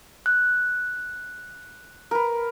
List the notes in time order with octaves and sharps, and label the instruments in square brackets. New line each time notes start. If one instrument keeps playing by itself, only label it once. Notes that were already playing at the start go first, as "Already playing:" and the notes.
[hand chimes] F#6
[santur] A#4 B4